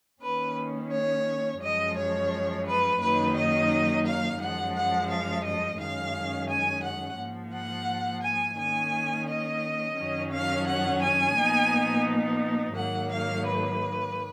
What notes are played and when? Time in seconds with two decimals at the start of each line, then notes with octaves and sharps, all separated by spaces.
0.22 D#3 A#3 C#4 B4
0.91 C#5
1.61 F#2 F3 G#3 D#5
1.96 C#5
2.65 B4
3.00 F#2 D#3 F#3 A#3 D#4 B4
3.35 D#5
4.05 F5
4.39 F#2 F3 G#3 F#5
4.74 F#5
5.10 F5
5.44 D#5
5.78 F#2 D#3 G#3 C#4 F5
6.49 G#5
6.83 F#5
7.18 G#2 F3 A#3
7.53 F#5
8.22 G#5
8.57 D#3 A#3 C#4 G#5
9.28 D#5
9.97 F#2 D#3 F#3 C#4
10.31 F5
10.66 F#5
11.01 G#5
11.36 A#2 F3 B3 D#4
12.75 G#2 D#3 F#3 A#3 F#5
13.11 F5
13.46 B4